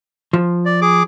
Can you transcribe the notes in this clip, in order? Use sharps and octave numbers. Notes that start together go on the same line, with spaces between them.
F3
D5
G#4 D6